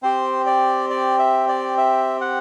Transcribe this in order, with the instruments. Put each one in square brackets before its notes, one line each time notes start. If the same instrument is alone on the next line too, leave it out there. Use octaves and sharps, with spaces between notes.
[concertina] C4 G4 C5
D5
D5
E5
D5
E5
F#5